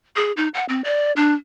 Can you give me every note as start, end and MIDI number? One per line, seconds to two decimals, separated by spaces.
0.16 0.32 68
0.37 0.48 63
0.54 0.65 78
0.69 0.81 60
0.84 1.12 74
1.16 1.34 62